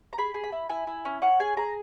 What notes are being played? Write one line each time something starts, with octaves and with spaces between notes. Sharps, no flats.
A#5
G#4 B5
G#4
B5
E4
E4 G#5
E4
C#4
C#4 F#5
G#4 G#5
G#4 A#5